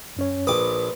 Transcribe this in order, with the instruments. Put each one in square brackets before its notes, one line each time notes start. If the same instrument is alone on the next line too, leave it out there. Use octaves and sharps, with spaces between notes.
[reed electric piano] F#2 C#4 C#5
[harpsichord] A#1 D6 D#6 [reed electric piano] B4